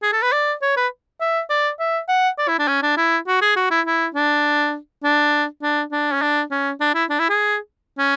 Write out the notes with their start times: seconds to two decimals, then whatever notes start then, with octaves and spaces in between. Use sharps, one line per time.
0.03 G#4
0.12 A4
0.23 B4
0.32 D5
0.62 C#5
0.77 B4
1.21 E5
1.50 D5
1.80 E5
2.09 F#5
2.38 D5
2.48 E4
2.59 D4
2.68 C#4
2.82 D4
2.97 E4
3.27 F#4
3.42 G#4
3.56 F#4
3.71 E4
3.86 E4
4.15 D4
5.04 D4
5.62 D4
5.92 D4
6.14 C#4
6.22 D4
6.51 C#4
6.81 D4
6.95 E4
7.10 D4
7.19 E4
7.30 G#4
7.98 C#4